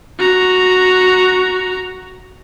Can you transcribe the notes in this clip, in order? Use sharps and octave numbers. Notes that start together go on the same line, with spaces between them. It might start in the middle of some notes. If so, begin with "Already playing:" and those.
F#4 A#5